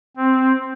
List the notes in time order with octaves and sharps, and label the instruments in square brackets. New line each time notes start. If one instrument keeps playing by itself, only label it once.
[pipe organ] C4